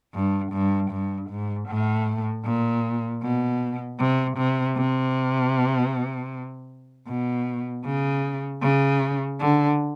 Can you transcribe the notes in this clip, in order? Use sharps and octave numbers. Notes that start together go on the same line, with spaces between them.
G2
G2
G2
G#2
A2
A#2
B2
C3
C3
C3
B2
C#3
C#3
D3